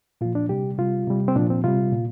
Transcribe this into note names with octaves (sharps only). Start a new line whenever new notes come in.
A#2 F3 F4
D4
C3 G3 G4
C3 G3 F4
C3 G3
C4
A#2 F3 D4
C4
C3 G3 F4
A#2